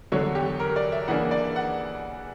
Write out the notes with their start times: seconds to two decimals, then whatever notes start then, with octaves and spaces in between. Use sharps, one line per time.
0.12 E2 D3 F#3 C#5
0.35 G4
0.60 A#4
0.76 D5
0.92 E5
1.08 C#3 E3 A#3 D4 F#5
1.31 D5
1.56 F#5